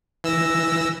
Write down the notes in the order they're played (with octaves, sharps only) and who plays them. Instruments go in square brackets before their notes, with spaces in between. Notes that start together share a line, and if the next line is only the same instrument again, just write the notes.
[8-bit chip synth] E3 E6 A#6